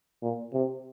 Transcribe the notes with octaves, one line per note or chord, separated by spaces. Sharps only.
A#2
C3